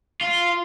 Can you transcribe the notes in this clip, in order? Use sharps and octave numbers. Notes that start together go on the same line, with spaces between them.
F4